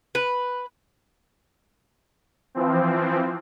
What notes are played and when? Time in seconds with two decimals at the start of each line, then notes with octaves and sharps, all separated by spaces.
0.15 B4
2.55 E3 F3 C4